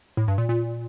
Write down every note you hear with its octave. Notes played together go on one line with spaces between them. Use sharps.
A2
G2
A#2
A#2